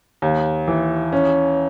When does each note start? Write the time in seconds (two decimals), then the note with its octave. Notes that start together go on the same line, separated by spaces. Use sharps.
0.22 D#2
0.68 E3
1.12 C#4